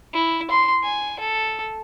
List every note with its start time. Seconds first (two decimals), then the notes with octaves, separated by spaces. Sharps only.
0.14 E4
0.51 C6
0.83 G#5
1.20 A4